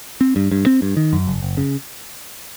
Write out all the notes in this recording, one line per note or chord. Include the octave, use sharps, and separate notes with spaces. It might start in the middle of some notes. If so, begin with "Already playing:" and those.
C4
G2
G2
C4
G2
D#3
F#2
F#1
F#1
C#3